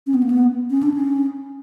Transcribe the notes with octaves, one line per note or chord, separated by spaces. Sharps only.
C#4
B3
A#3
B3
C#4
D4
C#4